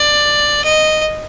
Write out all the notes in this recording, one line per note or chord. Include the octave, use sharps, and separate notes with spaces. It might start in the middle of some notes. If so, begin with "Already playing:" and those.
Already playing: D5
D#5